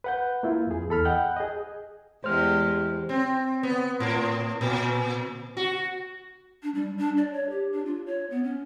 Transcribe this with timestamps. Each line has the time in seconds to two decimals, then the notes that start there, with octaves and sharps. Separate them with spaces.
0.04 B4 F#5 G6
0.43 A#3 E4 F4
0.67 F2 G#4
0.89 E2 A4 B5 F6
1.05 D#5 F#5 G5 F#6 G6
1.36 G#4 D#5
2.24 E2 G#3 G4 C5 F6
3.09 C4
3.63 B3
4.00 A2
4.61 A#2
5.57 F#4
6.62 D4
6.75 G3
6.98 D4
7.17 D5
7.33 C#5
7.50 G4
7.72 D4
7.86 F4
8.06 C#5
8.30 B3
8.44 C#4